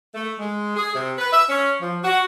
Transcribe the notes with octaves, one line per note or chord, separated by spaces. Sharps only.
A3
G#3
G#4
C3
B4
E5
C#4
F3
F#4